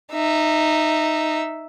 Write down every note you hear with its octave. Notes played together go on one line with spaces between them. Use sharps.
D#4 E5